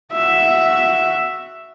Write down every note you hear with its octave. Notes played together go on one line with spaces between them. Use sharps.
F#4 E5